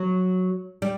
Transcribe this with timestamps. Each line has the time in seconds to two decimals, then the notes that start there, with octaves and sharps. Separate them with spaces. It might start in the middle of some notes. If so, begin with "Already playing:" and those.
Already playing: F#3
0.82 G3